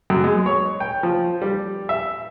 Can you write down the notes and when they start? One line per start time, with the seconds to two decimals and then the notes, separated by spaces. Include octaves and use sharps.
0.10 F#2
0.24 G#3
0.46 C#5
0.80 G5
1.03 F3
1.42 G3
1.89 E5